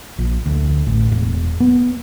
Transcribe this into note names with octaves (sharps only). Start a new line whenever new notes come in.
A#1
D2
A1
E1
B3